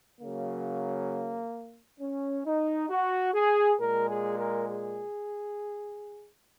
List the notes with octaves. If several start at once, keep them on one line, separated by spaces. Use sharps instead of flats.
C#3 F#3 A#3
C#4
D#4
F#4
G#4
A#2 G#3 A#4
G#4
A#4
G#4